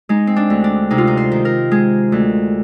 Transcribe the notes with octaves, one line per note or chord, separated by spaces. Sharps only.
G#3 D#4
C4
D4
D2
D4
C3 D#4
F4
D#4
C5
D#3
A#4
G#3 G#4
D2